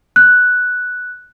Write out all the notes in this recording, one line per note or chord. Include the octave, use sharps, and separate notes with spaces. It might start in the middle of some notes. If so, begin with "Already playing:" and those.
F#6